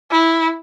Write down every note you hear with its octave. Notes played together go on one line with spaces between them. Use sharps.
E4